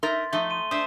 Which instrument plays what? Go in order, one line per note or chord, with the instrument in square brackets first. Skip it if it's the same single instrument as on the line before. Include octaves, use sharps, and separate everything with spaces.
[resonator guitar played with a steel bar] D#4 A#4 E5 [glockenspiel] C6 A6
[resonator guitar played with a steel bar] F3 D#4 [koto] A3 [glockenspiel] G7
[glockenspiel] C6 D#7 G7
[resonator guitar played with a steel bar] D4 [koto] C5 E5 [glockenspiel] D#6